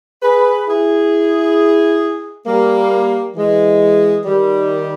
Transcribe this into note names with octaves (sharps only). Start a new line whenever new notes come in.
G#4 B4
E4 G#4
G3 A#3
E3 G#3
D#3 G3